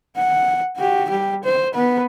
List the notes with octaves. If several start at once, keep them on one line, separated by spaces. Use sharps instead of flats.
F#5
F#4 G4
G3 G4
C5
B3 B4